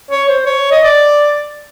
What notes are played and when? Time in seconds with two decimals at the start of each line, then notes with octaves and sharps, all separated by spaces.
0.11 C#5
0.28 C5
0.46 C#5
0.71 D#5
0.83 D5